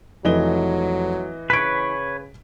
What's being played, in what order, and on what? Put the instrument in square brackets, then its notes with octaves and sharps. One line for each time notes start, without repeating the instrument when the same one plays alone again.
[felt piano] F1 [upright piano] E3 D#5 G7 [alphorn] F#3
[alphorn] C#3 [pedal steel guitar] B4 C#5 [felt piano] B6 D7